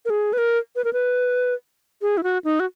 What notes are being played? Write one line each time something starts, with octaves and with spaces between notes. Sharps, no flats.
A#4
G#4
B4
A#4
B4
A#4
B4
G#4
E4
F#4
D#4
F#4